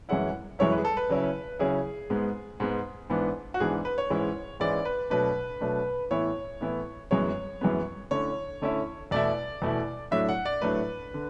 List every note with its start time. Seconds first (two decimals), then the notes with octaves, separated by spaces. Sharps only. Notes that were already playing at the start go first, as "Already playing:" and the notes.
0.09 F#2 E3 G#3 C#4 E4 F#5
0.59 F#2 E3 G#3 C#4 E4 C#5
0.72 B4
0.78 G#4
0.85 A4
0.97 B4
1.09 C#3 F#3 C#4 E4
1.59 C#3 F#3 C#4 E4 G#4
2.10 G#2 G#3 B3
2.60 G#2 G#3 B3
3.10 G#2 E3 B3 D4
3.54 F#4
3.60 G#2 E3 B3 D4 G#4
3.85 B4
3.98 C#5
4.10 G#2 E3 G#3 C#4 E4
4.60 G#2 E3 G#3 C#4 E4 D5
4.85 B4
5.10 B2 F#3 A3 D4 B4
5.61 B2 F#3 A3 D4
6.11 A2 E3 B3 E4 C#5
6.61 A2 E3 B3 E4
7.11 F#2 E3 G#3 B3 C#5
7.61 F#2 E3 G#3 B3
8.11 D3 A3 C#4 E4 C#5
8.62 D3 A3 C#4 E4
9.11 E2 B2 A3 E4 D5
9.62 E2 B2 A3 E4
10.11 A2 F#3 A3 D4 E5
10.29 F#5
10.45 D5
10.62 A2 F#3 A3 D4 B4
11.14 D3